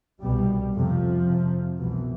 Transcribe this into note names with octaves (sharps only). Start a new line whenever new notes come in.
C2 B2 G3
F2 C3 F3
F2 C3
C2 B2 E3